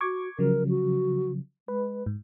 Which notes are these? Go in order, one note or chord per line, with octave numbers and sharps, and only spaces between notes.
F#4 C#6 D6 G#6
C#3 F3 F#3 A#4
F#4
G#3 B4
G#2